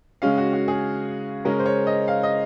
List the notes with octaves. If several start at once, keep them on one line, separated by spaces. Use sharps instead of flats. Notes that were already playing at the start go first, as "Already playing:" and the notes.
C#3 G#3 C#4 F5
F#4
F#4
G#4
C#3 G#3 C#4 A#4
C5
C#5
D#5
F5
D#5